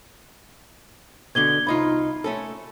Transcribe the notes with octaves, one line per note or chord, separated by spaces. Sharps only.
B2 D3 G#6 G7
C2 D#4 F4 B5
A3 C#4 A4